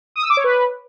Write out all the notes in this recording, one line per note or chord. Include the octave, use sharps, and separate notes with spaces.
D#6
E6
D6
C#5
B4